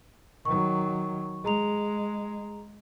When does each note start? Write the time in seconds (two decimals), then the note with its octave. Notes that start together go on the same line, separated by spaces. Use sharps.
0.45 D#3 F#3 C#6
1.44 G#3 G#4 A#5 F7